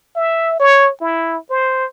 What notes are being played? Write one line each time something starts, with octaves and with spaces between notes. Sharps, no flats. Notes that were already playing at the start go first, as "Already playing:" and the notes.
E5
C#5
E4
C5